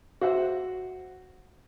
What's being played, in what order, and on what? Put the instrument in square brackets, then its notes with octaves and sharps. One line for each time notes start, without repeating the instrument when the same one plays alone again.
[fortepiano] F#4 C5 E5 F#5